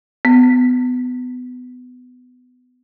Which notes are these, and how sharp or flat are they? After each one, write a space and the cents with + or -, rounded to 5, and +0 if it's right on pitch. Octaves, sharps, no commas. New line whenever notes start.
B3 +20